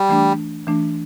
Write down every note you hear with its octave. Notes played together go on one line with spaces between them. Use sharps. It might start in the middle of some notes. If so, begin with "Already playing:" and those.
Already playing: G3
E3 A3 D4
E3 A3 D4